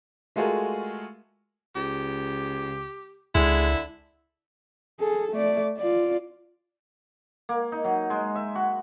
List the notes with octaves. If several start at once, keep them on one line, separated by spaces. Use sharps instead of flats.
G#3 A3 F4 F#4 G#4 A#4
C#2 G4
C#2 D3 G#3 E4
G#4 A4
A3 D5
F4 D5
A#3
D#4
F#3
G#3
E5
F#4